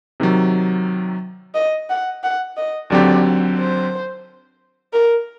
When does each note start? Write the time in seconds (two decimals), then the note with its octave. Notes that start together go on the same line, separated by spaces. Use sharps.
0.20 C3 D#3 F#3
1.55 D#5
1.90 F#5
2.24 F#5
2.57 D#5
2.90 D#2 D3 F#3 C4 G4 D5
3.58 C5
4.93 A#4